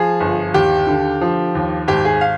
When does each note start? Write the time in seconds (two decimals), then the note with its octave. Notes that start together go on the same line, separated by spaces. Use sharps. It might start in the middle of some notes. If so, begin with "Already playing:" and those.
Already playing: F3 G#4
0.20 G1
0.54 D#2 G4
0.87 D3
1.21 F3
1.55 D#2
1.88 G#1 G4
2.05 G#4
2.21 F5